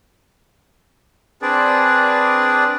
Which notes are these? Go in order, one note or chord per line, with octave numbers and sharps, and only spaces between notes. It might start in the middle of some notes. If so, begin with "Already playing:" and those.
C4 D4 G#4 B4 D5